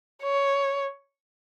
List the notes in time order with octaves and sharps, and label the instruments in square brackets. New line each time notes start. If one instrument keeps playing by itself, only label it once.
[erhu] C#5